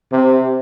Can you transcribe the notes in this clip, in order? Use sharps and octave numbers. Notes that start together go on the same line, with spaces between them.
C3